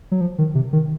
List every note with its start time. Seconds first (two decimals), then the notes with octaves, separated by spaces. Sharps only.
0.11 F#3
0.21 F3
0.38 D#3
0.55 C3
0.73 D#3